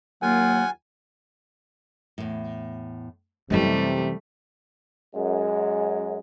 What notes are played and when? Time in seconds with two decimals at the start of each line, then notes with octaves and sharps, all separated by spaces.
0.22 D#2 F#3 A#3 F4 F#5 G#5
2.18 E2 A2
3.50 F#2 C3 E3 G3 A3 C#4 B4 D#5
5.15 F#2 G#3